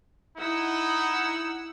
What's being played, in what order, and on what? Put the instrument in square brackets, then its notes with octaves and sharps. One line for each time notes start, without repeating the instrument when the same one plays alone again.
[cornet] D#4 [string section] E4 F#5 E6